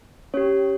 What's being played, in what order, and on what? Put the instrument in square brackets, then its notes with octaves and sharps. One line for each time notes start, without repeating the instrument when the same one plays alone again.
[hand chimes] C#4 G4 C#5